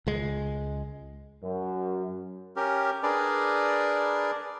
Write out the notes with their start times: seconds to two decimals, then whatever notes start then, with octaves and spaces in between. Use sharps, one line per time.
0.07 C#2 G#3
1.43 F#2
2.56 C#4 G4 A#4
3.03 D4 G#4 A#4 B4 D5